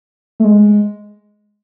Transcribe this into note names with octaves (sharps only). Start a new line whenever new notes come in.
A3
G#3